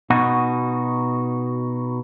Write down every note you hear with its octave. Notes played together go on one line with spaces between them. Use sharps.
B2 D#4 F#4